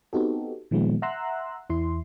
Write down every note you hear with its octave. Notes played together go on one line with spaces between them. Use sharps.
B3 C4 D#4 F#4 G4 A4
A#2 D#3 F3 G#3 B3
E5 F#5 A#5 C6 E6 F#6
E2 E4 C6